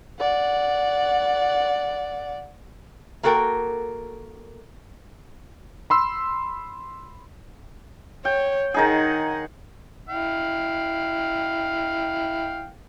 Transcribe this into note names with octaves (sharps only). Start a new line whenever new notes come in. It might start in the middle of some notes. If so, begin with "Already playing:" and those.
D5 F#5
A#3 F#4 A4 A#4 G5
B5 C6 E6
C#5 G5
D#3 D#4 G#4 F#5
E4 F5 G5